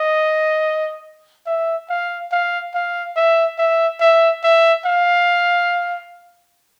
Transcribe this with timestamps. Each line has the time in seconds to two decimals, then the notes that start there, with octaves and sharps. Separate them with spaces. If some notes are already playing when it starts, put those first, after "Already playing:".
Already playing: D#5
1.47 E5
1.90 F5
2.32 F5
2.74 F5
3.16 E5
3.58 E5
4.01 E5
4.44 E5
4.85 F5